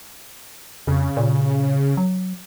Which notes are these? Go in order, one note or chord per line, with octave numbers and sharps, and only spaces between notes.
F2 C#3
A#2
F#3